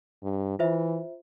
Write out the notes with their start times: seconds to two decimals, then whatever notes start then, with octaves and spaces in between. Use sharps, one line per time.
0.23 G2
0.59 E3 F4 C5 E5